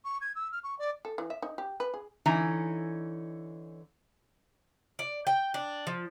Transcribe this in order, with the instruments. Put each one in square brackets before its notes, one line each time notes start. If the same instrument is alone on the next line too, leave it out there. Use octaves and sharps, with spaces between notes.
[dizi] C#6
G#6
E6
F6
C#6
D5
[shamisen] A4
E3
E5
D#4
G4
B4
G#4
[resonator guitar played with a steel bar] D3 E3 C#4 D#4 A#5
[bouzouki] D5
G5
D4
F3